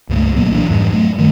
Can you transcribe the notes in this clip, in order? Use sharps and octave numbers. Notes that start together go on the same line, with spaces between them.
C#2 G2 G#3 A3
A#2 F#3 A#3 B3
B1 E3 C#4 D4
F2 G#2 E3 G3
F#3 A3
G2 D#3 G3 A3